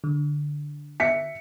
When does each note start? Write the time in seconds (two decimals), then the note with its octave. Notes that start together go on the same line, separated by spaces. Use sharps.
0.04 D3
1.00 E5 B6 C#7